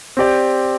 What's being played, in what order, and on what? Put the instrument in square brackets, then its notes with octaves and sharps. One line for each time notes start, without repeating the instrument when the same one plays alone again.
[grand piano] C4 G4 D5